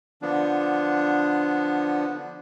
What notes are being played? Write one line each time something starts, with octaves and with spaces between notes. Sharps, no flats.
D3 F3 B3 D4